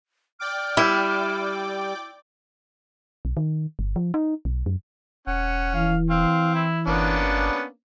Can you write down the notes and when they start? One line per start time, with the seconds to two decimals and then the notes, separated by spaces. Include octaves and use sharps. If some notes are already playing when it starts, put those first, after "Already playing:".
0.40 D5 G5 D6 F6
0.77 G3 E4
3.25 B1
3.37 D#3
3.79 G1
3.96 F3
4.14 D#4
4.45 B1
4.66 F#2
5.27 E1 C#4 F#5
5.75 E3 F5
6.10 C4 F5
6.55 E4
6.87 G1 A#3 B3 C#4 D4